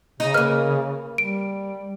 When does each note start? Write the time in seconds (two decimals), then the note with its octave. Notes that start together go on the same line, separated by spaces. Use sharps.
0.20 C#3 D#4
0.34 A#3 B4 F6
1.18 G3 D7